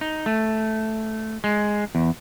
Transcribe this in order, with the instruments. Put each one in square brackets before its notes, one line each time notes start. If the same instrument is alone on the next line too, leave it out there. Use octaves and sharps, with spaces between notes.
[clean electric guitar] D#4
A3
G#3
E2